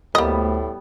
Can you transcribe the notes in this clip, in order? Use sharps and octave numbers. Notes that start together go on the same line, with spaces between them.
D2 A2 G3 A#3 B3 D#5